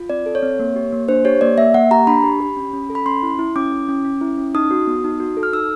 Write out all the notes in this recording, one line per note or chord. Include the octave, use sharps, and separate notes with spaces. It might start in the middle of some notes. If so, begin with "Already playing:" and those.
Already playing: F4
C4 D5
A4
C#5
C4
A#3
G4
A#3
D4 C5
G4 C#5
A#3 D5
A#3 E5
A#3 F#5
G4 A#5
D4 B5
G4
G4
C#4
C#4
A4
B5
C#4 C6
E4
E4
C#4 D6
E4
C#4
C#4
E4
C#4
D#4 D#6
F#4
B3
D#4
F#4
A4
F6
D#4 E6